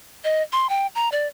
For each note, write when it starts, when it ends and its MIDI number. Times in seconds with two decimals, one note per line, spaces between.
0.24 0.42 75
0.52 0.69 84
0.69 0.87 79
0.95 1.09 82
1.12 1.27 74